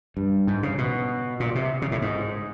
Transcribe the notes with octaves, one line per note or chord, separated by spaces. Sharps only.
G2
G#2
C#3
B2
A#2
C3
C#3
A2
G#2